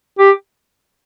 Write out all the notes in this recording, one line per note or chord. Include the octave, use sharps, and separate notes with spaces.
G4